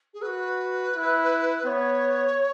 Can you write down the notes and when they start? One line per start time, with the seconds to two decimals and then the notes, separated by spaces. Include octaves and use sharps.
0.14 G#4
0.22 F#4 B4
0.94 E4
1.65 B3 C#5